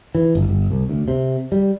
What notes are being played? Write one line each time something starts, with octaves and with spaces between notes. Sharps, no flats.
E3
G1
G1
C2
D2
C3
G3